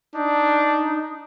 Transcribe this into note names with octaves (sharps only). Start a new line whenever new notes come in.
D4 D#4